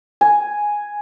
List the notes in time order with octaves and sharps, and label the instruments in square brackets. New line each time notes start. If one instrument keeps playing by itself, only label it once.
[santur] G#5